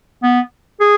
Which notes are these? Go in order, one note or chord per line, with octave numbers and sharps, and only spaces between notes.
B3
G#4